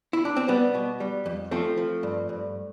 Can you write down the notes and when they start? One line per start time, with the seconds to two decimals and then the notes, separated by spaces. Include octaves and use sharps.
0.13 E4
0.25 D4
0.37 C4
0.48 G3 B3
0.75 B2
1.00 G3
1.26 F2
1.51 F3 A3 C4
1.77 F3
2.03 G2
2.29 G2